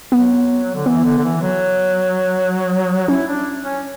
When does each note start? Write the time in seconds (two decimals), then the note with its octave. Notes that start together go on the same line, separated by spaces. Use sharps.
0.12 F#3 B3
0.75 D3
0.86 E3 B3
1.04 D3
1.17 D3
1.24 E3
1.41 F#3
3.08 C#4 E4
3.27 D4
3.64 C#4